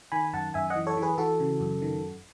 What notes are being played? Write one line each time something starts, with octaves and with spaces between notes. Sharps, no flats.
D#3 G#5 B5
F#2 F#5 A5
F#2 E5 G#5
D#5 F#5
E3
A4 C#5
E3
G#4 B4
E3 F#4 A4
C#3
F#2
D#3